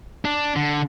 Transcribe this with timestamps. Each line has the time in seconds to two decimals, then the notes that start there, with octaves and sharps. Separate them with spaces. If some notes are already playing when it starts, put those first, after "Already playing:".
0.25 D4
0.56 D3